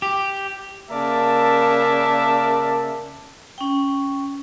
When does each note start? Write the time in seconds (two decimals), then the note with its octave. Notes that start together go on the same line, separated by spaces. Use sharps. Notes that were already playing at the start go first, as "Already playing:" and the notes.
0.02 G4
0.91 C#3 A#3 A#4 D5 E5 A5
3.58 C#4 G5